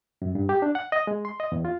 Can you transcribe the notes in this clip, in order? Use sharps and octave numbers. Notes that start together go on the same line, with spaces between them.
F#2
G2
G4
D4
F#5
D#5
G#3
C6
D#5
E2
F4